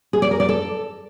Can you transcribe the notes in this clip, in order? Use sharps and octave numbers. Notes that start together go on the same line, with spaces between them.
G#4
D5
A#4
D5
A4